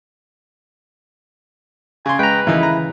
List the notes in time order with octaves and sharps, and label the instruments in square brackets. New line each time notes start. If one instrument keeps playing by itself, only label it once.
[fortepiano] C#3 C6 [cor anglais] G#5
[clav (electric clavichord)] G#3 [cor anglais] B4 [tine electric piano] G5 A#5
[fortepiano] D#2 D#4 [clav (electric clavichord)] C#3 E3 [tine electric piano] E4
[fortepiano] A#5